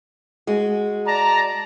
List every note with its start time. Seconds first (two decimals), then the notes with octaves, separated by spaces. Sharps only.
0.47 G#3 F#4
1.07 D5 A5 A#5